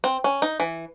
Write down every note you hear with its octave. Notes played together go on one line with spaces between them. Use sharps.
C4
C#4
D#4
E3